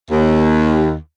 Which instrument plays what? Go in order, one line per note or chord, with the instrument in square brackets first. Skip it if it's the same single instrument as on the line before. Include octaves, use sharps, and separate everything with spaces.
[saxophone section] D#2